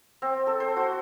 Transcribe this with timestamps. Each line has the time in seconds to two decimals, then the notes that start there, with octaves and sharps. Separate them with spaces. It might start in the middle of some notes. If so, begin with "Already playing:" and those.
0.22 C4
0.47 A4
0.60 C5
0.76 F#4